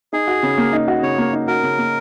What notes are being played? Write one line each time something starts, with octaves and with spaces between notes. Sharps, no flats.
D#4 G#4
F#4
C#3
A#3
D#4
F#4
C#3 C#5
A#3
D#4
F#4 A#4
C#3
A#3